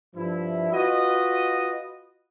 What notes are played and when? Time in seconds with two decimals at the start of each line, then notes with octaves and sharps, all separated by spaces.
0.15 G2 F3 E4
0.72 F4 F#4 B4 D#5